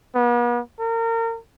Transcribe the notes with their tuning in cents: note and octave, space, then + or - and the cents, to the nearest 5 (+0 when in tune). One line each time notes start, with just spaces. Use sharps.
B3 -40
A#4 -30